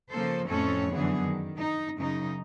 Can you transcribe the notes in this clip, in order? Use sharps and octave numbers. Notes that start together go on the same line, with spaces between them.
C#3 F3 A#3 A4 C5
F2 A2 C4 C#4 A4 C#5
F#2 D3 E3 B3 G#4
D#3
D#4
F#2 C#3 D#4